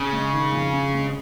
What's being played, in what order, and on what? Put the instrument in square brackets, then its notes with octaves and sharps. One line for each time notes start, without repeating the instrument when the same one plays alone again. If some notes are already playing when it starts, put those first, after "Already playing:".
Already playing: [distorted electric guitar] C#3 [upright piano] C#4
[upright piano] G#3
D#3
F2
C#4
G#3